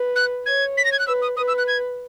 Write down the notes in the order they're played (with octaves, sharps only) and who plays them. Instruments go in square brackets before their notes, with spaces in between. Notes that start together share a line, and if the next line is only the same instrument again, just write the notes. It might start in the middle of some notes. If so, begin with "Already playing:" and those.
Already playing: [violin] B4
[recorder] F#6
[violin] C#5 [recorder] G#6
[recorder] B6
A#6
G#6
F#6
[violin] B4 [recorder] E6
[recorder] D#6
[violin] B4 [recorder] D#6
[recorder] E6
F#6
G#6